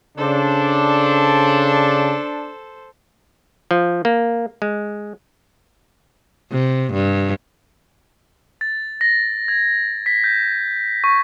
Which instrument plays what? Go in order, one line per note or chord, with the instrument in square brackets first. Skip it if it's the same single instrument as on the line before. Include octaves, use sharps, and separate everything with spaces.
[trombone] C#3 [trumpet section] D4 [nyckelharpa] A4 C5
[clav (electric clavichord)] F3
A#3
G#3
[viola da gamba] C3
G2
[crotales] A6
A#6
G#6
B6
G6
C#6